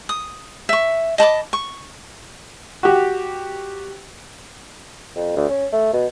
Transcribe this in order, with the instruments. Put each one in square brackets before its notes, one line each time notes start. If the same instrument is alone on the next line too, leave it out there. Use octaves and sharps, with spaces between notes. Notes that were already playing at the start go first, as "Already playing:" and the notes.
[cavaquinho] D#6
E5 C#6
D#5 A5 B5 D6
C#6
[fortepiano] F#4 G4
[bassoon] F2
D2
C#4
A3
B2